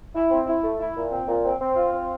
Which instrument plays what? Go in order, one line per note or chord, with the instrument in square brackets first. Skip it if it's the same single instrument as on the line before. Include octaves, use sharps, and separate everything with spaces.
[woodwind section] E4
C4
E4
A3
E4
A#2
C4
A#2
C4
C4
F4
C4